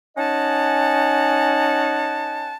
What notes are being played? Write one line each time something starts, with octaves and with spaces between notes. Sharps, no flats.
C#4 D#4 D#5 F#5 G#5 A5